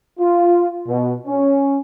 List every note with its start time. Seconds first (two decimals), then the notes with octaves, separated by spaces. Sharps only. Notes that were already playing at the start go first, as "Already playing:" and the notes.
0.18 F4
0.86 B2
1.26 C#4